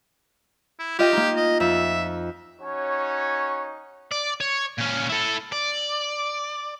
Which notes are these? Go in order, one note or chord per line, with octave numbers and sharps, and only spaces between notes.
E4
F4 G4 D#5 G5
A#3 D#4
D#5
F2 E5
C#4 D#4 F#4 C#5
D5
C#5
A#2 C#4
E4 A4
D5